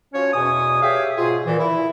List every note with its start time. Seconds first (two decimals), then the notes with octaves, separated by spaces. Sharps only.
0.13 F3 C#4 F#4 C#5
0.33 E2 B2 G#5 D#6
0.82 G4 G#4 C#5 E5 F5
1.17 G#2 B2 F4 G#4
1.46 A#2 E3
1.59 E4